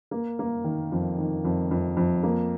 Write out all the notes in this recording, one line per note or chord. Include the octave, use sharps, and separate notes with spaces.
A#3
A#3
D#3
F2
D#3
F2
F2
F2
A#3